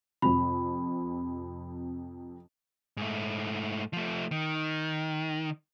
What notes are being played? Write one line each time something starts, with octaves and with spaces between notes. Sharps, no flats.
F2 C3 B5
G#2 A3
F3 A3
D#3